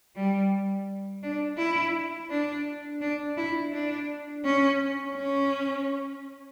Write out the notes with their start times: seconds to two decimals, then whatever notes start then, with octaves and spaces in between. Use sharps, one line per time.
0.16 G3
1.23 D4
1.58 E4
2.30 D4
3.01 D4
3.37 E4
3.73 D4
4.45 C#4
5.16 C#4